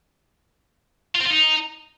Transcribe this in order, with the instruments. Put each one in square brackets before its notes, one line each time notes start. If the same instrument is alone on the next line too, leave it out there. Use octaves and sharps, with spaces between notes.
[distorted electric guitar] F4
C4
F4
D#4